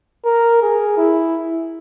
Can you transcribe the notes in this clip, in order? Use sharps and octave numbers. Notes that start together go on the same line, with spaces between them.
A#4
G#4
E4